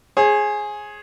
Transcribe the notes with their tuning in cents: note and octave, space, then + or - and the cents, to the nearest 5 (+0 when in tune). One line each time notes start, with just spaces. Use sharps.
G#4 +5 C#5 -45